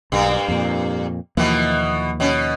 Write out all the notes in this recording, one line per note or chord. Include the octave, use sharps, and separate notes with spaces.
B1 G2 A#3
F2 A#2
D#2 B2 E3 F3 A#3
B2 C#4